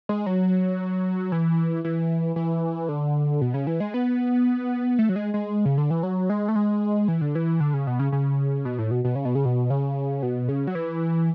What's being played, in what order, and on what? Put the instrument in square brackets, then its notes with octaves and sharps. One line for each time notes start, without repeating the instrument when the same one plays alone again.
[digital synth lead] G#3
F#3
E3
E3
E3
D3
B2
C#3
E3
G#3
B3
A3
F#3
G#3
G#3
C#3
D3
E3
F#3
G#3
A3
G#3
E3
D3
E3
D3
C#3
B2
C#3
C#3
B2
A2
B2
B2
C#3
B2
C#3
B2
C#3
B2
C#3
F#3
E3